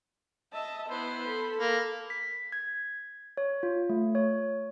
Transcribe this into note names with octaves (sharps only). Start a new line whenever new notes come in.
D#5 E5 A5
B3 E4 B4 C5
A4 B5
A#3
B6
G#6
C#5
F4
A3
C#5